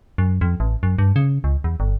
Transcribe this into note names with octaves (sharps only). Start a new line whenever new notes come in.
F#2
F2
A1
F#2
G2
C#3
C#2
E2
G1